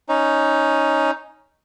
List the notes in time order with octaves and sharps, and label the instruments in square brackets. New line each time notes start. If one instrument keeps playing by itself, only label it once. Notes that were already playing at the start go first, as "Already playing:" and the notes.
[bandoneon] C#4 D#4